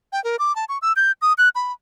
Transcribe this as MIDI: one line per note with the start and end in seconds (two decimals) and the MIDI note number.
0.13 0.22 79
0.24 0.36 70
0.39 0.55 86
0.56 0.65 81
0.69 0.78 85
0.82 0.93 88
0.96 1.12 91
1.22 1.33 87
1.38 1.49 90
1.55 1.72 83